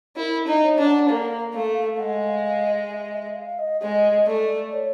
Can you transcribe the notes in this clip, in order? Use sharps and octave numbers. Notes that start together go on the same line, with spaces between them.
E4 A#4
D#4
C#5
D4
F#5
A#3 F5
A3
G#3 F#5
F5
F5
D#5
E5
E5
F5
D#5
G#3 D#5
A3 D5
C#5